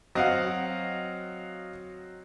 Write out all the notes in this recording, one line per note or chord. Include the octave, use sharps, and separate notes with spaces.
F#3 C4 F#4 D#5 F5 F#5